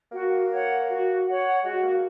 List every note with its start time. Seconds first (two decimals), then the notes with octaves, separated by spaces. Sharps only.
0.12 A#3 F#4
0.50 C#5 F#5
0.88 F#4
1.26 C#5 F#5
1.63 G#3 F#4
1.82 A#3